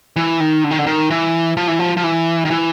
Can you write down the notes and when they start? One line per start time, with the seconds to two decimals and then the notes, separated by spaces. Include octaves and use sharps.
0.16 E3
0.40 D#3
0.64 D3
0.71 D#3
0.78 D3
0.86 D#3
1.10 E3
1.57 F3
1.68 E3
1.79 F3
1.97 F3
2.04 E3
2.45 D#3
2.50 E3